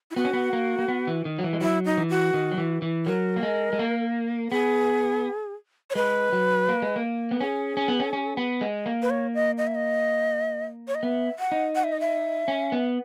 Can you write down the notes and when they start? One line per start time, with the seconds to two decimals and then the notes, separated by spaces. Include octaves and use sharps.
0.11 E4
0.16 B3 F#4
0.25 C#4
0.33 B3
0.53 A#3
0.79 A#3
0.88 B3
1.07 E3
1.25 D#3
1.39 F#3
1.44 E3
1.53 G#3
1.61 F#3 E4
1.85 D#4
1.97 E3
2.10 F#4
2.34 D#3
2.52 F#3
2.58 E3
2.82 E3
3.06 F#3 A#4
3.36 A#3
3.43 G#3
3.73 G#3
3.79 A#3
4.51 B3 G#4
5.90 C#5
5.95 G#3 B4
6.32 F#3
6.68 A#3
6.82 G#3
6.96 A#3
7.31 B3
7.41 C#4 G#4
7.77 C#4
7.88 B3
8.00 C#4
8.13 C#4
8.37 B3
8.61 G#3
8.86 A#3
9.02 B4
9.10 C#5
9.34 D#5
9.58 D#5
9.67 E5
9.75 D#5
10.88 C#5
10.95 D#5
11.03 B3 E5
11.39 F#5
11.52 D#4
11.76 F#5
11.84 E5
11.92 D#5
12.00 E5
12.48 C#4
12.72 B3